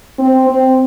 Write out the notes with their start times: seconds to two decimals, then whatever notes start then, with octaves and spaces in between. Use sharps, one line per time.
0.19 C4
0.49 C4